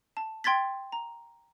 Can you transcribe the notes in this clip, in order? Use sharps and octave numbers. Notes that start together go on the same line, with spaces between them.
A5
G5 C6 G#6 A6 B6
A#5